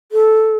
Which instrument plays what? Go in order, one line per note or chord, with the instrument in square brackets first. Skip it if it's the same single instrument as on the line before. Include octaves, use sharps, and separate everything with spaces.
[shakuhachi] A4